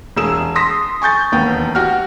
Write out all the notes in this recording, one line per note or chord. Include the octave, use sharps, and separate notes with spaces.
E1 G#4 E6 E7
C6 D#6 A#6 B6
G#5 C#6 G6 A6
E1 D#2 B3 G5
F#4 G4 F6